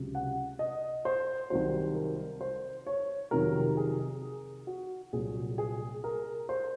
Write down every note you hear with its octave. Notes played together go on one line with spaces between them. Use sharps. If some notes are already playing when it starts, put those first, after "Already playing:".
Already playing: C#2 C3 F#3
F#5
D#5
C5
C2 C3 D#3 F#3 C5
A#4
C5
C#5
F2 C3 D#3 F#3 A#4
G#4
F#4
C2 A#2 F#3 G#4
G#4
A#4
C5